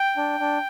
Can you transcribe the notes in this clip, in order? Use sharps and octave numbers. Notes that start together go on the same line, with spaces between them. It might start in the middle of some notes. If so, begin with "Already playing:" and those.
Already playing: G5
D4
D4